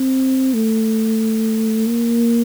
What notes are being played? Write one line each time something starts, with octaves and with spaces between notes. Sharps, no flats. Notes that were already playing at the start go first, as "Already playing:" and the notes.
Already playing: C4
A3
A#3